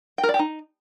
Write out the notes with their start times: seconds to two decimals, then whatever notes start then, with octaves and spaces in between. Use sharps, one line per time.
0.18 G5
0.23 A#4
0.29 D5
0.34 G4
0.39 D#4